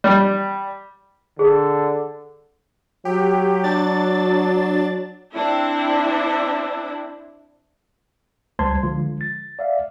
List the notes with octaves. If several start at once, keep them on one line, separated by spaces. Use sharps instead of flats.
G3
D3 G#4
F#3 G4
D4 A6
C4 D4 E4
C#2 G3 C5 A5 C6 G#6
D3 F3 G#3 F4
A6
D5 E5 F5